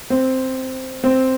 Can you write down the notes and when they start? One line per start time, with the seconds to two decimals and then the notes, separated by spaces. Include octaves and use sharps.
0.10 C4
1.04 C4